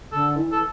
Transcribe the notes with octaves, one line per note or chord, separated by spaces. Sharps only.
D3 A4
E3
A4